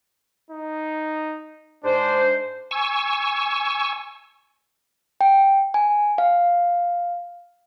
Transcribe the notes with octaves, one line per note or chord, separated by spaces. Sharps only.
D#4
G#2 D4 C5
G#5 C#6 E6
G5
G#5
F5